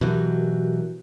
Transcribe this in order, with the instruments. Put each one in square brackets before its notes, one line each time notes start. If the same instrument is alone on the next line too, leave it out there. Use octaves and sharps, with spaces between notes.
[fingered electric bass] B2 E3 F#3 [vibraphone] F#4 G4 A#4